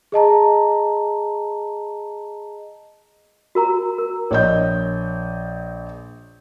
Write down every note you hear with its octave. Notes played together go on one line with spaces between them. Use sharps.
G#4 D#5 A5 A#5
F#4 A#4 A#5
A#4
A#1 C#5 D#5 G6